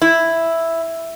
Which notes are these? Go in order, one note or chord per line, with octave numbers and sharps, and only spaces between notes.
E4